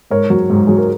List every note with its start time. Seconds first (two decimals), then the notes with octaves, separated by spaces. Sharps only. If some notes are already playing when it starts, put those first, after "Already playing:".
0.11 G#2 A#4 C#5
0.30 F#3
0.50 G#2
0.67 F#3 G#4
0.78 A#4